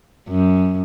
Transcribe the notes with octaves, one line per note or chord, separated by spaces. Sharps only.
F#2